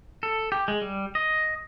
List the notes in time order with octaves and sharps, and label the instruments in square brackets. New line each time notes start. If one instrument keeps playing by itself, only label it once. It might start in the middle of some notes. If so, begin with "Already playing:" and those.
[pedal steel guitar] A4
G4
G#3
G3
D#5